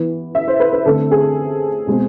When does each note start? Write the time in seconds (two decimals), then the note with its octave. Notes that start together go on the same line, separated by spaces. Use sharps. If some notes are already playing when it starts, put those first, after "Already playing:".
Already playing: E3 B3
0.35 E5
0.48 C5
0.60 B4
0.73 B4
0.86 D3 A3 C4 A4
1.12 G#4
1.87 B2 G#3 C4